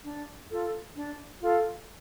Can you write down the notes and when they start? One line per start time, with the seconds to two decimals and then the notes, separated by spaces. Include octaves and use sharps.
0.04 D4
0.50 F4 A4
0.95 D4
1.40 F4 A4